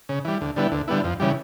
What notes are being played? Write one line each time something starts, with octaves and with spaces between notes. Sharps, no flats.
C#3
E3 G3
D2
D3 G3 B3 E4
D2
D3 G3 B3 E4
F2
C#3 E3 G3